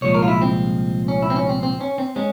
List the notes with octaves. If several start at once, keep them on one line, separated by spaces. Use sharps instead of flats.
C2 A#2 F3 G#3 C#5
A#4
F4
E4
C4
C#4
E4
C4
C#4
C4
C4
C#4
C4
G#3 C#4